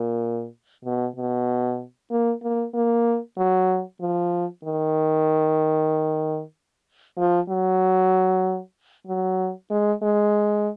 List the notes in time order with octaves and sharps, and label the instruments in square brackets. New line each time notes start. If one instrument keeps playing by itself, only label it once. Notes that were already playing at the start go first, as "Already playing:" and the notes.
Already playing: [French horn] A#2
B2
B2
A#3
A#3
A#3
F#3
F3
D#3
F3
F#3
F#3
G#3
G#3